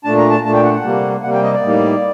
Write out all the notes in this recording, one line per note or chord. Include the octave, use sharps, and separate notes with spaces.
A#2 A3 D4 A5
A#5
A5
A#2 A3 D4 A5
G5
F#5
F#5
C3 G3 A#3
C3 G3 A#3 F#5
G5
D#5
D5
A2 G3 A#3 D#4